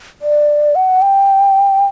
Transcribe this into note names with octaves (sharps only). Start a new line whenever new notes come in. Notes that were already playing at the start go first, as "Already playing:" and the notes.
D5
F#5
G5